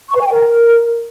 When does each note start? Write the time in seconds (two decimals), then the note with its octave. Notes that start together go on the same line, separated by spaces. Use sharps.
0.09 C#6
0.15 B4
0.21 G#5
0.26 G5
0.32 A#4